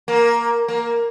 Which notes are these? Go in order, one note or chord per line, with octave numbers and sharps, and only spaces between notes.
A#3
A#3